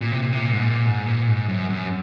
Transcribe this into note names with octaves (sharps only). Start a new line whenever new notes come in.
A#2
C3
A#2
C3
A#2
G#2
A#2
G#2
A#2
G#2
F#2
F#2